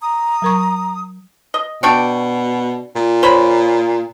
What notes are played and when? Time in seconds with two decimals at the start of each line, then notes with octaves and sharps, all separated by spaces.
0.02 A#5 D#6
0.42 F#3 A#4 C#6
1.54 D#5
1.83 B2 D4 G5 C#6
2.95 A#2
3.23 C5 C#5 B5